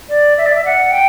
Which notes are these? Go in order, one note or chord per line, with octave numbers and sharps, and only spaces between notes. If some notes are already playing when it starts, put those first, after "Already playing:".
D5
E5
D5
E5
F#5
G5